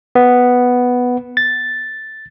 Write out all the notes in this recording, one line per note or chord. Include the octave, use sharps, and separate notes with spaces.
B3
A6